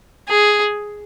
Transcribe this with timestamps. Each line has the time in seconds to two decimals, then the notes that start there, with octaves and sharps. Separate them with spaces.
0.28 G#4